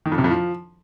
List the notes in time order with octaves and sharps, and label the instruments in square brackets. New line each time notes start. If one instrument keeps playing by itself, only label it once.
[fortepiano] D#3
F2
C3
F2
F3